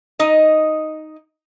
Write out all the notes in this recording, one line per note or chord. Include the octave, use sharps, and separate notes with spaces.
D#4 D#5